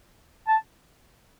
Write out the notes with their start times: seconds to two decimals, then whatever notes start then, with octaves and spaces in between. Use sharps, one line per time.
0.47 A5